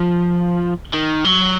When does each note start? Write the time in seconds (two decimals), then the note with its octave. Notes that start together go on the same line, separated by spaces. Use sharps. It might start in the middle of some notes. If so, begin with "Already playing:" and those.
Already playing: F3
0.94 D#3
1.25 F#3